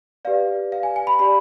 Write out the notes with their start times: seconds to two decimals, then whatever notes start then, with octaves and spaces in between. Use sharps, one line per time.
0.25 G4 B4 D5 F5
0.72 F5
0.83 G#5
0.96 G#5
1.07 B5
1.19 G4 D5 B5